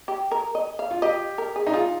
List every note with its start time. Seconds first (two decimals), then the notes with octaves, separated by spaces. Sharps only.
0.08 G4
0.31 A#4
0.55 D#5
0.79 F5
0.91 F4
1.02 G4 D#5
1.38 A#4
1.56 G#4
1.67 D#4
1.73 F4 G#4